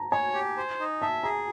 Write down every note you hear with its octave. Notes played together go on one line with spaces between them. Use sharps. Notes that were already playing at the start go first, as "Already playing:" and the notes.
Already playing: A5 A#5
C#5 G#5
G4
C5
D#4
E5 A5
G#4 A#5